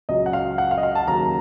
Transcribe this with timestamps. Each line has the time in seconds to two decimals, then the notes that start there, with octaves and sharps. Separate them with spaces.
0.09 C#2 C#3 F#3 D#5
0.26 F#5
0.33 F5
0.58 F#5
0.71 F5
0.78 D#5
0.83 F5
0.95 A5
1.07 D#2 C#3 F#3 A#5